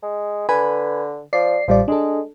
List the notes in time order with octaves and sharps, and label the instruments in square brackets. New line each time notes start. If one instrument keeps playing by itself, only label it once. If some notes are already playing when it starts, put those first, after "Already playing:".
[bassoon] G#3
[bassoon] D3 [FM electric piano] B4 G#5 B5
[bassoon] F3 [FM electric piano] D5 C7
[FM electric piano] A1 G3 D5 [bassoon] F3
[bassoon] G#3 [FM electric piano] D4 A4